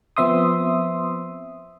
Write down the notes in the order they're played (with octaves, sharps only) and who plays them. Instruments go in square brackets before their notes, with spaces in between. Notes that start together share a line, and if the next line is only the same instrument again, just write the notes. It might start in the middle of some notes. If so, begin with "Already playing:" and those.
[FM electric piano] F3 B3 C4 E5 C6 D#6